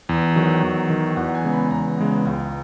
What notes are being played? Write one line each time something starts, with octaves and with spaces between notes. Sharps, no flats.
E2
D#3 F#3
E2
D#3 F#3
E2 F#5
F#5
G#5
C#3 G#3 B3
B5
E2 A#5
C#3 G#3 B3
C#2